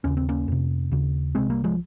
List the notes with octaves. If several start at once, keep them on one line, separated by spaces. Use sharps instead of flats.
D#2 C#3 C#4
C4
A#3 C#4
F2 C3
D#2 C#3
C2 C3 G#3 C4
G3 A#3
F3 G#3